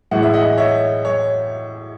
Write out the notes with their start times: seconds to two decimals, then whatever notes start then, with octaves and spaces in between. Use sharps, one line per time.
0.11 A2 E3 G#3 F#5
0.23 E5
0.33 D#5 F#5
0.58 C#5 E5
1.05 C#5